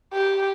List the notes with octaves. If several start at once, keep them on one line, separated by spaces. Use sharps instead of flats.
G4